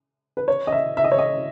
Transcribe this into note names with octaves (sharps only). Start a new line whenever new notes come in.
B4
C#5
D#5
E5
E5
D#5
C#5
D#5